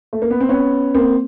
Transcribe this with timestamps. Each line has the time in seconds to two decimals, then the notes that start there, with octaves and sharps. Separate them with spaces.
0.13 A3
0.22 A#3
0.30 B3
0.40 C4
0.49 B3 C#4
0.95 A#3 C4